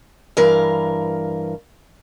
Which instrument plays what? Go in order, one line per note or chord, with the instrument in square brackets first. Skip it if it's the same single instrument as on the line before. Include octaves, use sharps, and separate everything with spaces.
[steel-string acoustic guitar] G2 E3 A#4 F5